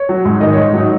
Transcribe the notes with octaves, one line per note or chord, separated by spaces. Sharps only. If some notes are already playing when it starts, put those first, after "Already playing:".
Already playing: C#5
F#3
G#2
D#3 D#4 D#5
G#2 C#5
C#5
F#3 D#4 D#5